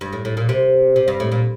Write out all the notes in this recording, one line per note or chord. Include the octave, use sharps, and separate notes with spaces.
G2
A2
A2
A#2
C3
C3
G2
A2
A#2